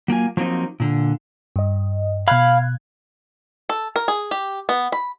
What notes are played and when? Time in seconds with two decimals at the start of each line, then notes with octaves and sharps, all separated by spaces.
0.08 F#3 A#3 F4 G#5
0.37 F3 F#3 A#3 C4 D#4
0.80 A#2 D3
1.56 G2 D#5
2.28 B2 F5 B5 F6 F#6 G#6
3.69 A4
3.96 A#4
4.08 G#4
4.31 G4
4.69 B3
4.92 B5